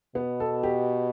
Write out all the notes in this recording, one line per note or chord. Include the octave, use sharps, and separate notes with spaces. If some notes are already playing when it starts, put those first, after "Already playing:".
B2 B3
A4
G4